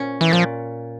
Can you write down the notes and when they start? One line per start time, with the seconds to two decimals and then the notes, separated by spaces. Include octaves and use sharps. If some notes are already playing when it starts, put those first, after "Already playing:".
Already playing: A#2 C#4
0.21 E3
0.31 A#2 F3